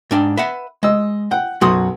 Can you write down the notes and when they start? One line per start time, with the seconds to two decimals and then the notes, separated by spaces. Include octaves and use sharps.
0.11 G#2 D4 G5
0.37 B4 E5 F#5
0.83 G#3 D#5 E6
1.31 F#5 G5
1.61 B1 F#2 F#4 C6 D#6